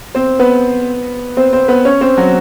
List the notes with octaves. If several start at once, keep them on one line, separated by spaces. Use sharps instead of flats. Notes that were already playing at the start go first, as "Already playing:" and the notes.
C4 C5
B3 B4
C4 C5
C4 C5
B3 B4
C#4 C#5
C4 C5
F#3 F#4